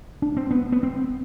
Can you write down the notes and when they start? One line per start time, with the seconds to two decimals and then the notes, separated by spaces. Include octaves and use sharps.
0.22 D4
0.37 C4
0.51 B3
0.72 B3
0.83 C4